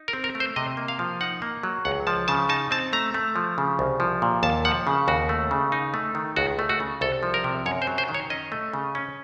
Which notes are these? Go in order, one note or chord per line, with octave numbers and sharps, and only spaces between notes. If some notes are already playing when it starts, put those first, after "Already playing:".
Already playing: D#4
A#4
C4
A#4
A3
C5
C3 D#5
A#3
F5
F3
D#4 F#5
A#3
F#3
C#2 F#5
F3 A5
C#3 A5
D#4 A5
C4 A5
A3 A#5
A3
F3
C#3
C2
F3
A#2
D#2 A5
F3 F#5
C#3
D#2 F#4
A3
C#3
D#4
A3
D#3
C#2 F#4
A3
F#4
C#3
C2 A4
F3
A#4
C3
F#2 C#5
C5
F#3
C5
D#3
C#5
C#4 D#5
A3
C#3
C#4